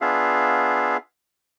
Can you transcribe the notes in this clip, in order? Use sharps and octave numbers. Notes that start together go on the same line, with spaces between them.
B3 D4 F4 G#4 E5 F5